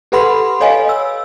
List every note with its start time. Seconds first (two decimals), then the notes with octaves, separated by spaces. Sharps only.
0.12 G4 A4 B4 F#5 B5 C6
0.60 A4 C#5 D#5 F5 G#5
0.89 E6